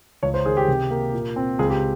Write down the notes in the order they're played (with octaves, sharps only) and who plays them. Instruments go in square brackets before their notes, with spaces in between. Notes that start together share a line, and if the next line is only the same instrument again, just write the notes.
[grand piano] C#2 C#5
C5
D#3 G#4
G4
C3
A#3
A#2
C4
C#2 G#4
G4